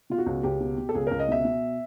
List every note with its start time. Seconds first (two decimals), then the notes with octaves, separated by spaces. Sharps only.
0.10 B2 F4
0.18 F#4
0.26 C#2
0.43 C#2 G4
0.60 B2
0.78 B2
0.89 A4
0.95 C#2 G#4
1.07 C#2 A#4
1.19 D#5
1.28 B2 E5
1.45 B2